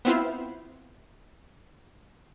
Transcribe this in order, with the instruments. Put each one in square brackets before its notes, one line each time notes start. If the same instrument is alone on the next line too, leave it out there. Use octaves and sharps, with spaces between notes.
[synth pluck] B3 C4 E4 F4